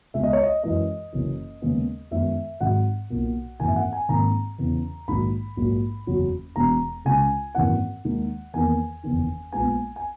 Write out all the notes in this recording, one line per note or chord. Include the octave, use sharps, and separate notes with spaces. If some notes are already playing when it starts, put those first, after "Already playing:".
C#2 B2 G#3 E5
D#5
C#5
D#5
F#2 E3 G#3 D#5
F#1 F#2 E3
D#2 C#3 G#3 B3
F#2 D#3 G#3 B3 E5
G#1 G#2 F#3 F#5
B1 A#2 A#3
G#1 F#2 E3 A#3 G#5
E5
F#5
G#5
G#1 G#2 D#3 A#3 A#5
E2 C#3 E3
A#1 G#2 D#3 F#3 B5
A#1 G#2 F#3 A#3
F#1 E2 B2 F#3
E1 E2 B2 G#3 A#5
C#2 C#3 G#3 G#5
G#1 F#2 E3 A#3 F#5
D#2 D#3 G#3
E2 D#3 A#3 G#5
F#1 E2 D#3
A#1 A#2 G#3 B3 G#5
G#5